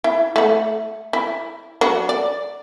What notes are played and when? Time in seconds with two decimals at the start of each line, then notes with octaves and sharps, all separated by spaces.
0.04 E4
0.36 A3 F#5
1.13 E4
1.81 F#3 D4 F#4
2.09 D5